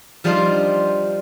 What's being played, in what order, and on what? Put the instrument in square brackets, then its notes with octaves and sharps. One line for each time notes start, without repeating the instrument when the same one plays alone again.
[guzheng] F3 G3 D4 D#4 F4 C5